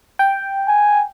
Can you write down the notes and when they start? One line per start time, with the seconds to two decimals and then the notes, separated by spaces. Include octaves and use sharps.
0.19 G5
0.68 G#5